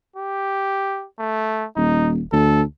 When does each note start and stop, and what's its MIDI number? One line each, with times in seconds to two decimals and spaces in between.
0.16 1.06 67
1.19 1.67 57
1.77 2.22 27
1.77 2.12 63
2.33 2.63 38
2.33 2.62 69